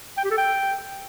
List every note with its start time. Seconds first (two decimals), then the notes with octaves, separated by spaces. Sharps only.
0.18 G5
0.24 G4
0.31 A4
0.38 G5